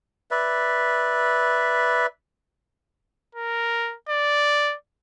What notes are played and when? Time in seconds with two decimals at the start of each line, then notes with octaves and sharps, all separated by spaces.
0.31 B4 D5 E5
3.35 A#4
4.09 D5